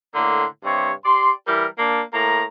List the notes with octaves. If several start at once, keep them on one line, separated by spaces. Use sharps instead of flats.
A2 D3 A#3 C6
G2 C3 C4 C#5
G4 D5 C6
E3 G3 E4 A#4
A#3 D4
A2 A#3 A#5